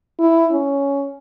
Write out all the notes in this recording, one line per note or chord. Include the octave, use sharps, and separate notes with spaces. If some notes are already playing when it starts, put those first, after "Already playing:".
E4
C#4